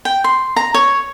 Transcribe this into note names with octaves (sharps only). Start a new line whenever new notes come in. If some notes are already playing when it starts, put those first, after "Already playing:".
G5
C6
A#5
C#5